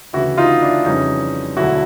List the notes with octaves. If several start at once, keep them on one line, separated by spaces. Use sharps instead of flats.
D2 C#3 E3 E4 F#4
D#4 F4
D4 E4
F2 C#3 E3 G3 C#4 D#4
E1 D2 D3 F#3 E4 F#4